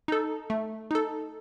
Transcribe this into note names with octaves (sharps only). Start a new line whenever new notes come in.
D#4 A4
A3
D#4 A4